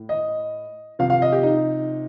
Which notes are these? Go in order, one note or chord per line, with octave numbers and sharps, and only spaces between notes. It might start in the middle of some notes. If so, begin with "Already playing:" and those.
Already playing: A2
D#5
C3 F3 F5
F5
D#5
G4
D#4